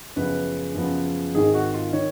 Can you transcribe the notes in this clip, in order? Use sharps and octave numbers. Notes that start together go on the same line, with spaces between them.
F#2 C#3 F3 B3 B4
F#2 C#3 F3 B3
G#1 G#2 D#3 G#4
F#4
F4
D#3 C#5